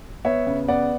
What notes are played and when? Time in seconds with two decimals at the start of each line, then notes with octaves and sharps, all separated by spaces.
0.25 B3 C#5 E5
0.47 C#3
0.68 B3 D5 F#5